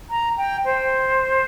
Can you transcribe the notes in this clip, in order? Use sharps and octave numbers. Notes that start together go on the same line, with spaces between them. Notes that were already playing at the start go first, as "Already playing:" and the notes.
A#5
G5
C5